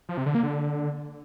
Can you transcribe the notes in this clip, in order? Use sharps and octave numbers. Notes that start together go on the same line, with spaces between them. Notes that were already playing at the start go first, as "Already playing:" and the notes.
F3
C3
D3
A#3
D3